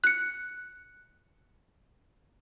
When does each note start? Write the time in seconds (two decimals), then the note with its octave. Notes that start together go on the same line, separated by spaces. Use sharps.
0.04 F#6 C#7